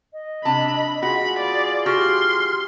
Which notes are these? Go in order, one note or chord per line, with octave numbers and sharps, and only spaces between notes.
D#5
C3 D4 A5 B5
F4 F#4 G#4 B5
D5 F5
F#4 G4 C6 F6